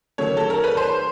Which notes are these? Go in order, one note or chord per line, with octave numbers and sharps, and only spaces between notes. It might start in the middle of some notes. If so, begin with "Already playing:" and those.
D#3 F#3 A3 C#5
A4
A#4
B4
C5